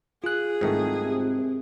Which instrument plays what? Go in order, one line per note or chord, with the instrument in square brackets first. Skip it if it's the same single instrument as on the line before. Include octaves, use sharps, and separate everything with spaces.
[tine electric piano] F4 F#6 [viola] G#4
[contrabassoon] C2 [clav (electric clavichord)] G#2 D#3 A3
[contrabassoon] C3